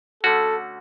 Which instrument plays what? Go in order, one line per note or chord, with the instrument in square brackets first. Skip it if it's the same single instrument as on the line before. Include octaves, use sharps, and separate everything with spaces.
[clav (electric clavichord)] D3 A3 C#4 F#4 [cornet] A4